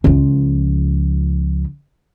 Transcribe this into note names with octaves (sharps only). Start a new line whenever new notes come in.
C#2 F3